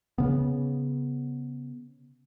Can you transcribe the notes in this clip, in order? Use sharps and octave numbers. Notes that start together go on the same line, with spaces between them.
C#3 B3